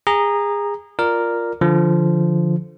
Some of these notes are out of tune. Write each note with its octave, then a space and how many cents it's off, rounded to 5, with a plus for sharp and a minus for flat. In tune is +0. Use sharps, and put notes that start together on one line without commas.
G#4 -25 A#5 +0
F4 +0 A#4 +0 D5 +0
D3 +0 F3 -10